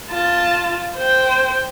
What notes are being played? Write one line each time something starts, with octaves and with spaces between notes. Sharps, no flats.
F4 A5
C5 G5